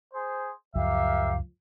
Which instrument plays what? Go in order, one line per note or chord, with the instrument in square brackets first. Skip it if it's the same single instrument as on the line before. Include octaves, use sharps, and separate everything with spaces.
[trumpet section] G#4 C5
[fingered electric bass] C#2 F#2 F3 [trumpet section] G4 A#4 E5 [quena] F5